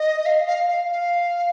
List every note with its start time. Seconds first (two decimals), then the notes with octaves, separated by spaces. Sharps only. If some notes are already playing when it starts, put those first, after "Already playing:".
Already playing: D#5
0.26 F5
0.48 F5
0.69 F5
0.92 F5